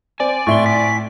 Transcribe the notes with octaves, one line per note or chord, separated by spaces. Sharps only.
C4 D5 G#5
A2 E5 C6 C#6 G7
B6